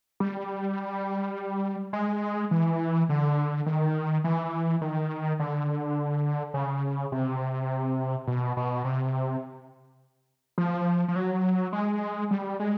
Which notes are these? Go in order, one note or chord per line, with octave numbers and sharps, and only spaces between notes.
G3
G#3
E3
D3
D#3
E3
D#3
D3
C#3
C3
B2
B2
C3
F3
F3
F#3
G#3
G3
G#3